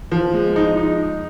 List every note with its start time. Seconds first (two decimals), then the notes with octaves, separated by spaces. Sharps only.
0.12 F3
0.34 G#3
0.56 D#4
0.77 D#4